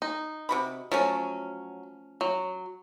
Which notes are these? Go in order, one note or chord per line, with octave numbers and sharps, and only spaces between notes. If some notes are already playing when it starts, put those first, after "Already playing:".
D#4
C3 F#4 B5
F3 F#3 A3 C#4
F#3